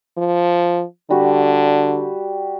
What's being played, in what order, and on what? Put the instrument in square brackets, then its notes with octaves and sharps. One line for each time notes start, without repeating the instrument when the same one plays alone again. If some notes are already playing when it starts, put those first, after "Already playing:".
[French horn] F3
[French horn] D3 [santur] G3 F#4 G4